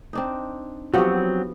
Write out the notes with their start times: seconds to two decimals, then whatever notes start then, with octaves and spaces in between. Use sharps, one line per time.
0.13 C4 D4 D#4
0.94 F3 F#3 B3 C4 F#4 G4 F#5